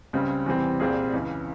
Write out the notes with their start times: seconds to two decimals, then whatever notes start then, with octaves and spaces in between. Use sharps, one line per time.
0.13 C#2 C#3 G3 C4
0.46 E2 C3 E3 G3 C4
0.80 C2 A#2 G3 C4 G#4
1.13 C#2 C#3 E3